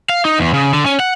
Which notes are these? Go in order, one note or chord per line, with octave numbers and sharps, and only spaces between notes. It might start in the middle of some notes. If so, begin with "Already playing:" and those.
F5
D#4
E2
C#3
D3
C#4
F#5